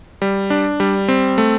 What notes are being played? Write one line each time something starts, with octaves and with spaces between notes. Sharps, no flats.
G3
D4
G3
C4
A3